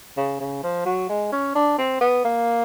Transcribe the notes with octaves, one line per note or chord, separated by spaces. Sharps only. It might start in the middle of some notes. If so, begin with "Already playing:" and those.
C#3
C#3
F3
F#3
G#3
C#4
D4
C4
B3
A#3